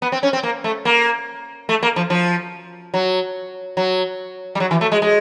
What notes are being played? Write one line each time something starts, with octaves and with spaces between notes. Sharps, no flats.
B3
C4
C#4
C4
A#3
A3
A#3
A3
A#3
F3
F3
F#3
F#3
G3
F#3
E3
A3
G#3
G#3